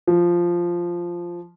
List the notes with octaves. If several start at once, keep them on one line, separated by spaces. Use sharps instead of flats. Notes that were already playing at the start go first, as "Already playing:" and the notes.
F3